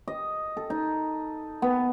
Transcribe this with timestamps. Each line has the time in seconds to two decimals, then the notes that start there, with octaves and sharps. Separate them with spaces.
0.08 D#5
0.57 A4
0.70 D#4
1.62 B3